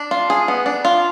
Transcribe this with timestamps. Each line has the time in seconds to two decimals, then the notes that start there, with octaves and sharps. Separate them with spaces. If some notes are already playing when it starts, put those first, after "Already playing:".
Already playing: D4
0.11 F4
0.30 G#4
0.48 B3
0.66 D4
0.85 F4